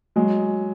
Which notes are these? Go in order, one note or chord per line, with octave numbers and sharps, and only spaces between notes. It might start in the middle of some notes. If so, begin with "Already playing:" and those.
F#3 G#3